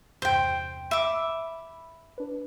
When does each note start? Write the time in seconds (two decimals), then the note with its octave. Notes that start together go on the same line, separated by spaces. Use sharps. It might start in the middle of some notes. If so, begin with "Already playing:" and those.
0.22 E2 G2 C3 C5 G5
0.91 E5 B5 D6
2.18 D4 B4